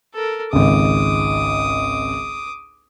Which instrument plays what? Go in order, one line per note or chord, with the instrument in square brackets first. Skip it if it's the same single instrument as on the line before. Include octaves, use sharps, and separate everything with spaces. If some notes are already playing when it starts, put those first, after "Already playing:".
[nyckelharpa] A4 A#4
[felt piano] G#1 C#2 [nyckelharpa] D6 D#6